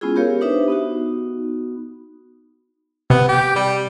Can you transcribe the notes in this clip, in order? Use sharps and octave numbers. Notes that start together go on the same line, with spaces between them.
G#3 B3 C#4 E4 F4 G#4
B3 G4 A#4 C#5 F5
D4 D#4 G4 B4 C5 E5
B3 D#4 F#4
C3 B3
G4
G3